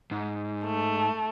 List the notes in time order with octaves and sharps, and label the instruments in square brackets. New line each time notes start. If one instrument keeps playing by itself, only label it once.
[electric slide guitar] G#2
[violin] A3